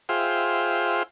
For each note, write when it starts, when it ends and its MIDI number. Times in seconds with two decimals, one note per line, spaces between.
0.09 1.03 65
0.09 1.03 68
0.09 1.03 72
0.09 1.03 76
0.09 1.03 77
0.09 1.03 79